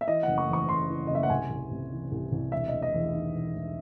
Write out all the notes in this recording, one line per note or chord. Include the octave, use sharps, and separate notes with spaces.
E5
E3 D#5
F#1 F#5
C#6
E2 C#6
C#3 C6
E3
F#1 D#5
E5
F#5
C2 G#5
C2
C3
E3
C2
C2
E1 E5
E1 D#5
D#5
E2
D#3
E1
E1